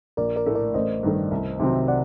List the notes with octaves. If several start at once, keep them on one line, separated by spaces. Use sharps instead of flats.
A#1 A#4 D5
A#4 D5
A2 A3
A#4 D5
A1 C5 D#5
G2 D#3 A3
C2
C3 D#3 F#3 C4
D5 F#5